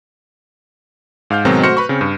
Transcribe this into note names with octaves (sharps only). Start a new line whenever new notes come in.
G#2 F5 F6 G6
G#2 B2 D#3 F#3 G#3 C4
A3 F#4 C5 F6 A#6 C#7
B4 B5 C#6
C#3 C4
G2